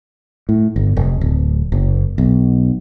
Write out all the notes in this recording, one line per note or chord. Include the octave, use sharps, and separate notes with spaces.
A2
G1
F1
D1
F#1
B1